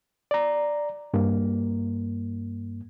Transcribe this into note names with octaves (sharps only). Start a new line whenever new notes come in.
D5 A#5
G2 A#3